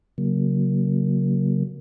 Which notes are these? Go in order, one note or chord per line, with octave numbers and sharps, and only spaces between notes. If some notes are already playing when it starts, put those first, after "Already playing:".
C#3 F#3 A#3